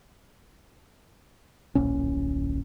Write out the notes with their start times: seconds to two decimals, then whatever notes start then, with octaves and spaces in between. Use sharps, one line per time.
1.75 D1 A#1 A#2 C#4